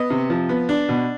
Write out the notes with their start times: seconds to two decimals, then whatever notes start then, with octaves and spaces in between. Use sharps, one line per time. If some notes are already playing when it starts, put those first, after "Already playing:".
Already playing: B3 D#5
0.10 C3
0.30 F3
0.49 B3
0.69 D4
0.89 B2